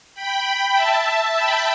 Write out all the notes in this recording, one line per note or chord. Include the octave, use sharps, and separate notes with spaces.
G5 B5
E5 A5
G5 B5